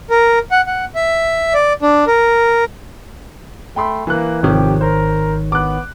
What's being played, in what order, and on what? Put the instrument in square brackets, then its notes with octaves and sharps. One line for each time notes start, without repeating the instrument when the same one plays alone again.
[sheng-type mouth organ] A#4
F#5
F#5
E5
D5
D4
A#4
[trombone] A3 [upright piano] G5 B5 C6
[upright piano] E3 F#6 [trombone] A#3
[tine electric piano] G#1 D#3 C#5 [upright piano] C3 F3 [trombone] G4
[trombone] A#4 [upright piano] C5
[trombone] B3 [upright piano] D6 F#6